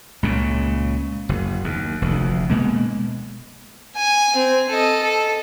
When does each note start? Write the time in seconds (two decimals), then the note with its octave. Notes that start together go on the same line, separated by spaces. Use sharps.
0.23 C#2 A#2 C#3
1.29 F#1
1.64 D#2
2.02 F1 D2
2.50 B2 G#3 A#3
3.96 G#5
4.36 C4
4.69 A4 D#5
5.03 A4